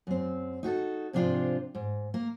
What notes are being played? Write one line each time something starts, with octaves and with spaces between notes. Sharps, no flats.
F#2 C4
D#4 F#4 G#4 A4
G#2 C3 F3 D4 F4 C5
G#2
A#3 A#4